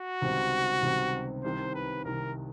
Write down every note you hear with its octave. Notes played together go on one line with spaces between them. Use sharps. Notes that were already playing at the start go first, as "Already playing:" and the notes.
Already playing: F#4
C#2 C3 D#3 G3 C4
C#2 C3 D#3 G3 C4
C2 C3 D#3 C5
B4
C2 C3 D#3 A#4